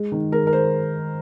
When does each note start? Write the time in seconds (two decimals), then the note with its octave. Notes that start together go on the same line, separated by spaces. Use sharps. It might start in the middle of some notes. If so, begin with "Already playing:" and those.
Already playing: G#3
0.12 D#3
0.32 G#3 A#4
0.47 A#4
0.53 G#3 C5